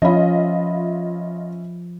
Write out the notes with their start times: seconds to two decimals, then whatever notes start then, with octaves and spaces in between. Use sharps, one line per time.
0.02 F3 C#4 F4 D#5 E5 B5